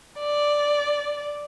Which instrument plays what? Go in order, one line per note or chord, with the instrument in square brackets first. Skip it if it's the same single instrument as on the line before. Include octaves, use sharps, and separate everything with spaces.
[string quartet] D5